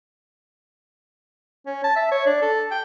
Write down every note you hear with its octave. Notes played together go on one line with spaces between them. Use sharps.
C#4
A5
E5
C#5
D4
A4
G5